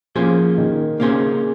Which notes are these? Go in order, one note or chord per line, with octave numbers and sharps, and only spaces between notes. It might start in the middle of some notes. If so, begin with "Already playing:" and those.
F3 A#3 C#4 G#4 C5
D#3
C#3 A#3 C#4 G#4 C5